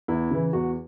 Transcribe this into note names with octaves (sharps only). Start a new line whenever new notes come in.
E2 E4
C#3 E3
E2 F#4